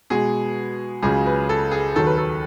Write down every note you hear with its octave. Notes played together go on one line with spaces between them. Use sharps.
B2 G#3 B3 G#4
C#2 C#3 F#3 G#4
B4
A4
G#4
D#2 D#3 F#3 A4
B4
A4